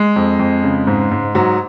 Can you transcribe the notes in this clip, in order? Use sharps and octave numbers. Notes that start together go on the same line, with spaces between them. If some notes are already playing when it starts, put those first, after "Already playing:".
Already playing: G#3
F2
F2
C#3
G#2
G#2
G#2 F#3